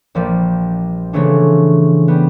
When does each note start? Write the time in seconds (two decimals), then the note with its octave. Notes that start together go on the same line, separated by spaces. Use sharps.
0.15 A#1 F3 G3
1.13 C#3 E3 F3 A3 C#4 D4
2.08 G3 B3